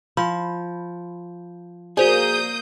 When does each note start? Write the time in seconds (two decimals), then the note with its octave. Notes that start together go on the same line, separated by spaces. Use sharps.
0.17 F3 B5
1.97 A#3 F#4 G#4 C5 D5 D#6 G6